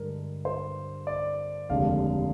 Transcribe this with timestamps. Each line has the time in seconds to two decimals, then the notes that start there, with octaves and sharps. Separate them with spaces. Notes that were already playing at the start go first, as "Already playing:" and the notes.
Already playing: G2 D3 G#3 A#4
0.45 C5
1.07 D5
1.69 F1 D#2 D3 G#3 F5